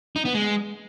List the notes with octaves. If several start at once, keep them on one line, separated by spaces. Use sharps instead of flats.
D#4
B3
G#3